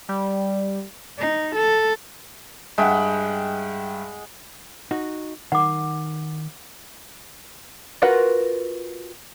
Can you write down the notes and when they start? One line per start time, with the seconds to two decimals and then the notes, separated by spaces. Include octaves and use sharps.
0.09 G3
1.19 D#4
1.56 A4
2.78 G2 G#3 E5 F#5 G5
4.91 D#4 F#4
5.52 D#3 F#5 D6
8.02 F4 F#4 A#4 B4 F#5